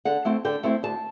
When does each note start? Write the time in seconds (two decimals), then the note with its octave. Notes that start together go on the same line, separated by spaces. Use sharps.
0.05 D3 F#5
0.25 A3 C4 E4
0.45 D3 G5
0.63 A3 C4 E4
0.83 D2 A5